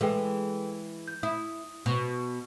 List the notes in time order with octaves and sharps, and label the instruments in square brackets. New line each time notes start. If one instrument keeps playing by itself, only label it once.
[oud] E3 G#3 [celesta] A4 B4 G5
[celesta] G6
[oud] E4 [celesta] D#6
[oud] B2